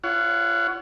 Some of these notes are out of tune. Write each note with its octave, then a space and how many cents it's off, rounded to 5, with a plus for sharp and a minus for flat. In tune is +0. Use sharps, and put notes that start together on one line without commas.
F4 -35 C#5 +25 F#5 +0